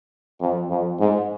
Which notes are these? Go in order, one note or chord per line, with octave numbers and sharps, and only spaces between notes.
F2
F2
G#2